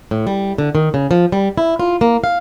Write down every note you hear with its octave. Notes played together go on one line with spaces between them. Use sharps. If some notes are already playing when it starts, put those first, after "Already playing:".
A2
G3
D3
D#3
C#3
F3
G3
E4
F4
A#3
F5